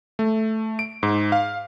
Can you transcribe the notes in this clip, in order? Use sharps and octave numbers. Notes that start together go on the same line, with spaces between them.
A3
D7
G#2
F5